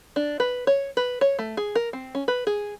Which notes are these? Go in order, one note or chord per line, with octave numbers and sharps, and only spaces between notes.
D4
B4
C#5
B4
C#5
A3
G#4
A#4
C4
C#4
B4
G#4